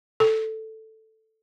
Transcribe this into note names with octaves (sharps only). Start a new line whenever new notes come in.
A4